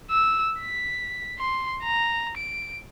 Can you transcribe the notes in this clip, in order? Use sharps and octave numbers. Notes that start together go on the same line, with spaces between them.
E6
B6
C6
A#5
D7